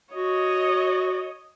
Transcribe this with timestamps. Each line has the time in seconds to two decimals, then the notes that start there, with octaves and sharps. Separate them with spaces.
0.15 F#4 C#5 D#5